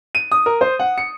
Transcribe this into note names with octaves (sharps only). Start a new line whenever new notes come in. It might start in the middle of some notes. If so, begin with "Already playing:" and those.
D#7
D#6
A#4
C5
F#5
C#7